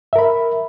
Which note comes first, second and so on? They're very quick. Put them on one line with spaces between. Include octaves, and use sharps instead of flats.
E5 A#4 B5